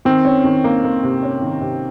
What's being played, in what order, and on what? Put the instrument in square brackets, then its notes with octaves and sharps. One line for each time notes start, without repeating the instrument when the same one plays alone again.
[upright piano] D#3 [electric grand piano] C4
[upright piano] C#4
D#3
A#3
A#3
C3
C#4
D#3
C3